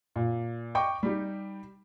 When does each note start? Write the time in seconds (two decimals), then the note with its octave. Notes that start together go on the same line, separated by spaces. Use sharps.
0.16 A#2
0.75 D#5 G5 C#6 D6
1.03 G3 D#4 G4